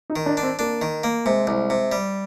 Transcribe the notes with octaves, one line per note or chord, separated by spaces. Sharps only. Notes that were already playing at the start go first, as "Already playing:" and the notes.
D#4
D#3
D4
D4
C4
A#3 D4
D#3
A#3
C3 G#3
C2
C3
G3